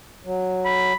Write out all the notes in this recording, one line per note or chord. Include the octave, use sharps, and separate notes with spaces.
F#3
B5